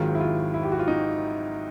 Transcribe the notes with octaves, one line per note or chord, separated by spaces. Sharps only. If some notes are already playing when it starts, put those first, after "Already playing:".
Already playing: G#1 G#2 D#3 F#3 F4
E4
F4
E4
G4
F#4
F4
D#4